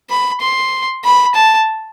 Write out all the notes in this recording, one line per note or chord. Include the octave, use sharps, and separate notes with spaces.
B5
C6
B5
A5